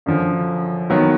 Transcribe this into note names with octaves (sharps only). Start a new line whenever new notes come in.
F#2 D3 F3
D#3 F#3 B3